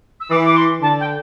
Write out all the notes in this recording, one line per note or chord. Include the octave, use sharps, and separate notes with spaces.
E6
E3 D6
D6
C6
D3 A5
G5